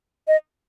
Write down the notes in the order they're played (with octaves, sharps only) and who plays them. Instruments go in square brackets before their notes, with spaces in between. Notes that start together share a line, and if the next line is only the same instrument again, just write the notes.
[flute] D#5